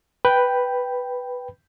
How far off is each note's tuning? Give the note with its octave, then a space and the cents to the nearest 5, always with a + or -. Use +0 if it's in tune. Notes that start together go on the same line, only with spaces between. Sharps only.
B4 +0 G5 +0 B5 +0